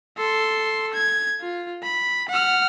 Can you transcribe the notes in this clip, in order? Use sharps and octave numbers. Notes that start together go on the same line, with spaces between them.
A4 C6
G#6
F4
B5
F#5 F6